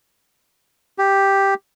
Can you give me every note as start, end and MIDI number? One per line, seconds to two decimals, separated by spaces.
0.98 1.54 67